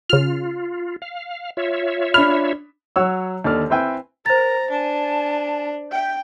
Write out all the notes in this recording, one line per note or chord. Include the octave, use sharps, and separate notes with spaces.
C#3 F4 F6
F5
F4 C#5 E5
D4 B5 F6
F#3 C#5 F#5 E6
D#2 D3 A4 D5 F6
C4 E4 B4 E5 G5 G#5
A#4 C5 A#5 A6
D4 G#5 A5
E5 G5 G6